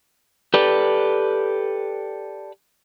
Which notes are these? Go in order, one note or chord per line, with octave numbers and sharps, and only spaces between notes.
G4 A4 B4 D5